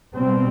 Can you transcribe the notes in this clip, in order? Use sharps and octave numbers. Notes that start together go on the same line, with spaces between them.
B2 G3 C4